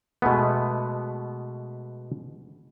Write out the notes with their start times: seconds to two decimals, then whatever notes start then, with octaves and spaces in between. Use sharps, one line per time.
0.22 B2 G#3 A3 B3